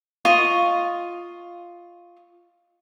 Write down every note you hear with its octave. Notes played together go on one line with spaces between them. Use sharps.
F4 D#5 C#6